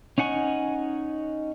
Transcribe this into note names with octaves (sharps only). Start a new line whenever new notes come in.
C#4 D#4 F#5 G#5 C#6